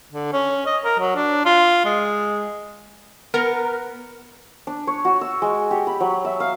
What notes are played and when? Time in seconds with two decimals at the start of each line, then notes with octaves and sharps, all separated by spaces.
0.12 D3
0.33 C#4
0.66 D#5
0.84 A#4
0.99 F#3
1.16 D4
1.45 F4
1.85 G#3
3.34 B3 A#4
4.67 D4
4.87 C#5
5.05 F#4
5.21 E6
5.42 G#3
5.71 G4
5.87 B5
6.00 F#3
6.25 E5
6.40 F5